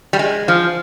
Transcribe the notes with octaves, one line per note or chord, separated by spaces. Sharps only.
G3
G#3
F3